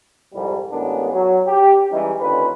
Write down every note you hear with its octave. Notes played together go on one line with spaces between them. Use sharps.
C2 F2 G#2 G3
A1 A2 G#3 B3 D4 A#4
F#3
G4
E3 G3 G#3 C#4 D#4
D#2 D3 C#4 F4 B4